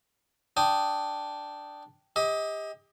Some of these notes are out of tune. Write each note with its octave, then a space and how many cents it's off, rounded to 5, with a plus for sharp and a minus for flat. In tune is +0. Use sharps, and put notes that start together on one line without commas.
D4 +0 G5 -5 D#6 +0
G4 +35 D#5 +30